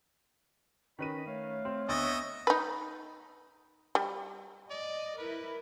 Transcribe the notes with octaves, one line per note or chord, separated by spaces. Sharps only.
D#3 C#4 B4 D#5 B5 D#7
A3 C#5 F5
C4
D2 B3 D#5 E5 C#6 A6
D#4 B4
G3
D5 D#5
E4 A#4 B4